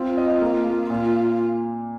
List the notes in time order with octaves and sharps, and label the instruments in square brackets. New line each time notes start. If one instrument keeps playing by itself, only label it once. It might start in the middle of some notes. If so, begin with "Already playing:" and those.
Already playing: [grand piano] C4 [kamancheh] F4
[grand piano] D#5
A#3
A#3
[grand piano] A#2 [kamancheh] F4